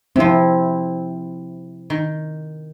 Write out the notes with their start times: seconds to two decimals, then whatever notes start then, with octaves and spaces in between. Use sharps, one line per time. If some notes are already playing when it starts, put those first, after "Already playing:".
0.16 C3 F3 C4 E4
1.90 D#3